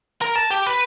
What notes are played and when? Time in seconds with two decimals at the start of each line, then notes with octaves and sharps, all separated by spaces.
0.22 A#4
0.36 A5
0.50 G4
0.67 B4